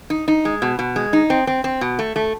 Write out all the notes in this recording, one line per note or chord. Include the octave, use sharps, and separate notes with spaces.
D#4
D#4
G#3
B2
B2
G#3
D#4
C4
C4
C4
B2
A3
A3